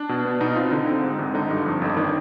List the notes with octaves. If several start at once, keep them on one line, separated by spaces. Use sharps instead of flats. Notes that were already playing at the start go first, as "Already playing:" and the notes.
Already playing: D4
B2
B3
B2 D#4
C4 F4
D3 D#4
C4
G#2
G#1
D3 D#4
G2
F2
G1
D#3 D4